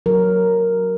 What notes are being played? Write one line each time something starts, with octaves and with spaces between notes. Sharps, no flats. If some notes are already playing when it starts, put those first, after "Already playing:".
F#3 A#4